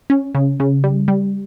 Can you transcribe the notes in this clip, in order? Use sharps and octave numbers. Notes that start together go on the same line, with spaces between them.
C#4
C#3
C#3
G3
G3